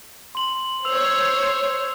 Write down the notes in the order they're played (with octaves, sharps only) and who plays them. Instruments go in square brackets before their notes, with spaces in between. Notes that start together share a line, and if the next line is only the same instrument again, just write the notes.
[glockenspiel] C6 F#7
[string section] C5 C#5 [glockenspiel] E6 F7